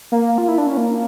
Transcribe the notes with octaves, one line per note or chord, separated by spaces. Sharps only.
A#3
F4
E4
D4
C#4
A#3